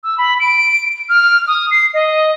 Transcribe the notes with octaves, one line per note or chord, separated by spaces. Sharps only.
E6
B5
D7
F6
D#6
C7
D#5